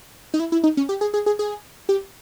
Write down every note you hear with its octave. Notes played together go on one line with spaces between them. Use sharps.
D#4
E4
E4
D#4
C#4
G4
G#4
G#4
G#4
G#4
G4